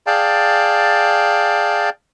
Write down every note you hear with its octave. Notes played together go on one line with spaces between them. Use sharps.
G#4 D5 F5 G5 A5